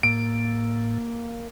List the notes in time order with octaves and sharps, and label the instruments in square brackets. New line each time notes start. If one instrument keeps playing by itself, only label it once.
[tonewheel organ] A2 [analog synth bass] A#3 [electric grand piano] D7